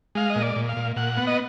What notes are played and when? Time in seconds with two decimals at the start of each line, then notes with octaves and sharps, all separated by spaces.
0.15 G#3 F5
0.30 D#5
0.36 A#2
0.42 D5
0.56 A#2
0.69 F5
0.77 A#2
0.96 A#2 F#5
1.17 B3
1.27 D#5